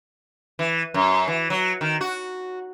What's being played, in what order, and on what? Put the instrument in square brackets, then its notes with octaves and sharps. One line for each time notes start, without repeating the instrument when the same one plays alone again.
[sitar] E3
F#2
E3
F#3
D#3
F#4